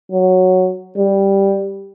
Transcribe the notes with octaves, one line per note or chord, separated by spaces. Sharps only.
F#3
G3